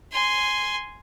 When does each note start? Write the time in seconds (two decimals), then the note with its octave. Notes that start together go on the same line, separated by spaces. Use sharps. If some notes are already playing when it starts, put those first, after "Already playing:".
0.12 G#5 C6